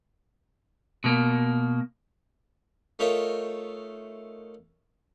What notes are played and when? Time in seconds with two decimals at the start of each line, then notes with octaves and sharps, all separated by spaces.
1.04 B2 A#3
2.99 A3 D#4 F4 A#4 C#5 E5